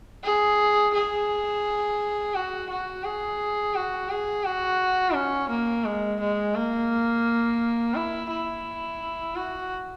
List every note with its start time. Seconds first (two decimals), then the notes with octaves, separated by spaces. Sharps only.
0.24 G#4
0.95 G#4
2.35 F#4
2.70 F#4
3.04 G#4
3.75 F#4
4.10 G#4
4.45 F#4
5.15 C#4
5.49 A#3
5.85 G#3
6.20 G#3
6.55 A#3
7.95 E4
8.30 E4
9.36 F#4